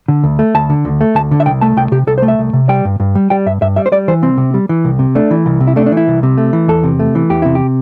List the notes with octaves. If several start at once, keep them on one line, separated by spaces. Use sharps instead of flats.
D3
D2
A3
D2 A5
D3
D2
A3
D2 A5
D3
E5
C2 G5
A3 A5
C2 G5
C3 G4
C2 A4
C5
A3
E5
C2
C3
G3 G5
G2
G2
G3
G3 G5
G2 E5
G2 E5
G3 E5
C5
G3 D5
E3 C5
C2 C4
C3
G3
E3
C2
C3
A3 D4
E3
C2
C3
E4
A3 D4
D4
E3
E4
C2
C3
A3
E3
E2 A4
C3
A3
E3
E2 G4
C3 E4
G4